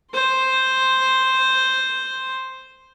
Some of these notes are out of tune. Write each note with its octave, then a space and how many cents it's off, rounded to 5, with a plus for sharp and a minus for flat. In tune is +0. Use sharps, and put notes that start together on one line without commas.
C5 +0 C6 +0